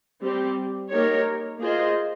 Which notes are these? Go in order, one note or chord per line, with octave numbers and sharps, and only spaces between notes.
G3 C4 G4
A#3 D#4 G4 A#4 C#5
A#3 F4 G#4 C5 D#5